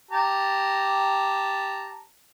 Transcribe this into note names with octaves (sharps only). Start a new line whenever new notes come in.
G4 A5 A#5